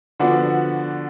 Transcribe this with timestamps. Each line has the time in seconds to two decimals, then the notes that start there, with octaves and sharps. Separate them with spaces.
0.20 D3 F3 B3 D4 F#4